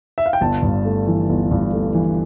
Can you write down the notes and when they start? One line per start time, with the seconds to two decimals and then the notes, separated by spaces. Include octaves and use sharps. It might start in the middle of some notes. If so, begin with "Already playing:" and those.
0.18 E5
0.26 F5
0.33 G5
0.41 G1 A5
0.63 G2
0.85 A3
1.07 E3
1.29 G1
1.51 G2
1.73 A3
1.95 E3